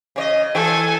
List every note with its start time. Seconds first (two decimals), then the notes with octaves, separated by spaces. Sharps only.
0.16 C#3 C#5 D#5
0.55 E3 A4 G#5